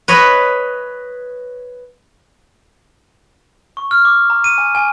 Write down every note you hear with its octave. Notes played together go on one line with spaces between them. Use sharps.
B4 C#5 D#5
C#6
F6
D6
A#5
D#7
G#5
G#5